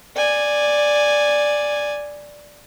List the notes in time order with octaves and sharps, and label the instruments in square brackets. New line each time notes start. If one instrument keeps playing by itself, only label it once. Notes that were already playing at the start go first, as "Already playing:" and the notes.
[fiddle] D5 G#5